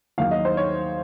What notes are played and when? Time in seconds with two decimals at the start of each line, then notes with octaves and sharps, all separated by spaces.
0.18 D#2 D#3 F#3 F5
0.31 D#5
0.45 C5
0.57 C#5